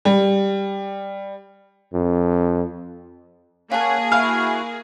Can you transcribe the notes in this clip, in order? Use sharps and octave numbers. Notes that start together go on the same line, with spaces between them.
G3
F2
A#3 C#4 G#4 C#5 F5 F#5 A5
E4 F#4 F5 G#5